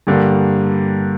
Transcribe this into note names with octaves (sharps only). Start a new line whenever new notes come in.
G2 D3 G3 A#3